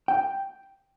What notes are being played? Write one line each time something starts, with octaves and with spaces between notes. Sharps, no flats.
G5